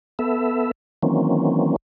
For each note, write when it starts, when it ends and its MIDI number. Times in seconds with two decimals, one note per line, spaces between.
0.19 0.71 59
0.19 0.71 69
0.19 0.71 76
1.03 1.76 51
1.03 1.76 52
1.03 1.76 54
1.03 1.76 58
1.03 1.76 60
1.03 1.76 61